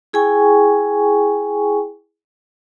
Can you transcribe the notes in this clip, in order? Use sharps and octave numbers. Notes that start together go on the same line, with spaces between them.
E4 G#4 G5 G#5 C#6